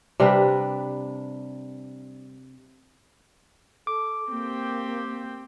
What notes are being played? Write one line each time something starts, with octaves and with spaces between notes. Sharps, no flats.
C3 G3 D4 B4
A4 D6
A#3 C4 G4